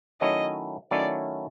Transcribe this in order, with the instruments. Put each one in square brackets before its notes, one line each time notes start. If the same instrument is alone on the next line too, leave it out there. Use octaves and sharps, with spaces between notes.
[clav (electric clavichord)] D#3 F#3 A3 C#4 E4 [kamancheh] D#5
[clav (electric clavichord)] D#3 F#3 A3 C#4 E4 [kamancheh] D5